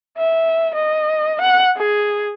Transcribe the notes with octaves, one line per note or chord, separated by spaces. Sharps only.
E5
D#5
F#5
G#4